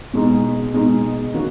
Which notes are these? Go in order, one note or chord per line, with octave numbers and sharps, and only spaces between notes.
B2 G#3 D#4
B2 G#3 D#4
D#3 A#3 C#4 F#4